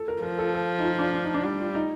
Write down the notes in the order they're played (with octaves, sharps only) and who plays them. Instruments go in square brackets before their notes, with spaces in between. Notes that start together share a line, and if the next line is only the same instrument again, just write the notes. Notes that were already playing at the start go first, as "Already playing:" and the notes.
Already playing: [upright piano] A4
A#4
[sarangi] F3 [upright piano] A#4
[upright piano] A4
A4
D#4
F4
D4
D4
D#4
D4
[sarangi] G3
[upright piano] F4
D#4